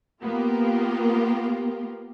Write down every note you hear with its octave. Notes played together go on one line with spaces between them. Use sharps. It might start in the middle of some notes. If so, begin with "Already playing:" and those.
A#3 B3 F4 G4 A#4